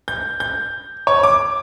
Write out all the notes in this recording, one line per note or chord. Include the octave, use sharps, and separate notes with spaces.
G6
G6
C#5
D6